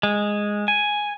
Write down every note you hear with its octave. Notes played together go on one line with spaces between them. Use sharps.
G#3
G#5